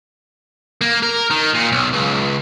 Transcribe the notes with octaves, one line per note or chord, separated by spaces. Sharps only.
A#3
A#4
D#3
A#2
B1
C#2